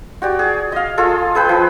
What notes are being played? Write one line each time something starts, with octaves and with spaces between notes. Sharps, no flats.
F#4 G4 D5
G#4
D#5 F5
F4 G#4 A4
G#4 B4 G5
F3 E6